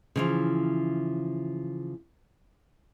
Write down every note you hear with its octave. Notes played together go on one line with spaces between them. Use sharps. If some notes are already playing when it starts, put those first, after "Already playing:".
C#3 E3 F3